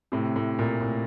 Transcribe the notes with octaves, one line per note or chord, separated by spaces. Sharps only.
A2 C3
A2
A#2
A2